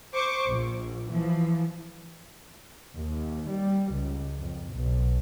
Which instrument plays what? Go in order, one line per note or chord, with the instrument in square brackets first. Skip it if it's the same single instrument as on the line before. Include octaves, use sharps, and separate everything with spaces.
[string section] C5 C#6 D6
A#1
E3 F3
[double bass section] D#2
G3
C#2
F2
B1